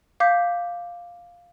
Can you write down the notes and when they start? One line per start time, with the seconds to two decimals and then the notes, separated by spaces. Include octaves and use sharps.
0.20 F5 D6 G6 B6